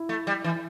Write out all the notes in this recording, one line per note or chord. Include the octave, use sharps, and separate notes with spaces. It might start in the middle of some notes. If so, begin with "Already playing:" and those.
Already playing: E4
A3
G3
E3